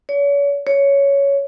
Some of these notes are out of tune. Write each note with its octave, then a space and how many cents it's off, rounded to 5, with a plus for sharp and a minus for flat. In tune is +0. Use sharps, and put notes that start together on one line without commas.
C#5 +40
C#5 +10